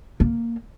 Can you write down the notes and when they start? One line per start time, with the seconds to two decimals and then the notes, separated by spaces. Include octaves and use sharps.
0.20 A#3